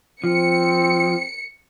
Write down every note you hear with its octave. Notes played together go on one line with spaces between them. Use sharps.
F3 C4 C#7